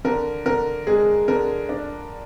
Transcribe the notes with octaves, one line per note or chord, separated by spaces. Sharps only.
D3 A#4
D3 A#4
G#3 G#4
D3 A#4
D4